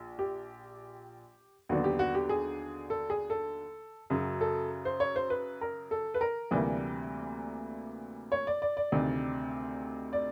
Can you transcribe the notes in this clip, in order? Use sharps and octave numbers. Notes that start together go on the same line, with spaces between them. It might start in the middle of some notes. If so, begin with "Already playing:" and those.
Already playing: A#1
G4
D#2 D3 F#3 B3 D4 F#4
G4
F#4
G4
G#4
A4
G#4
A4
F#2 C#3 F#3
A4
C5
C#5
C5
B4
A#4
A4
B4
A#4
D2 C3 E3 G3 A#3
C#5
D5
D5
D5
D2 C3 D#3
D5